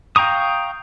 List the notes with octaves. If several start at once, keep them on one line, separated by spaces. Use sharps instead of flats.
F5 G5 A#5 C#6 D#6